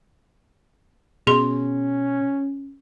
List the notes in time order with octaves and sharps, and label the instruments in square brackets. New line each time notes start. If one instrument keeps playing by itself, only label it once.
[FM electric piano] B2 [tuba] C#4 [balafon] G#4 C6